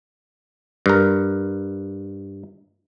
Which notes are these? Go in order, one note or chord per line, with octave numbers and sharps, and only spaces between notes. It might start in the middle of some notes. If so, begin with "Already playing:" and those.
G2 A#4